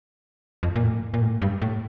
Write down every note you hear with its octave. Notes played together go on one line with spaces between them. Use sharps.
F2
A#2
A2
A#2
A2
G2
A2